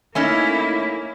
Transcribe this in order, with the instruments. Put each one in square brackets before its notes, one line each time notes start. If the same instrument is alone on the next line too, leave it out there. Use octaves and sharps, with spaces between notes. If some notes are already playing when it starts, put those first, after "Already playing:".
[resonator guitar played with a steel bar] A3 C#4 D#4 [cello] A#3 E4